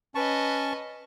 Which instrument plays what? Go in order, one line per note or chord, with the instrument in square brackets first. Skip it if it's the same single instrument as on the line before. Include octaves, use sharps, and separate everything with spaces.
[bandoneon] C#4 [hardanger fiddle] B4 D#5 [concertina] A5 C#6